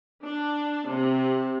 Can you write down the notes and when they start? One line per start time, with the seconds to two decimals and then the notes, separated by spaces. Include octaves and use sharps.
0.23 D4
0.88 C3